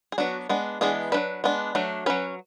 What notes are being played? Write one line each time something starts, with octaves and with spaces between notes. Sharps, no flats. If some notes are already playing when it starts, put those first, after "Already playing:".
G#4
F#3 B3 D4 F#4
G#3 B3 D4
E3 G#3 B3 D4 G#4
F#3 A3 D4 B4
G#3 B3 D4
F#3 A3 D4
F#3 C#4 B4